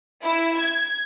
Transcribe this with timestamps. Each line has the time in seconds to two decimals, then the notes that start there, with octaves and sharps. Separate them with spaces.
0.23 E4
0.59 G#6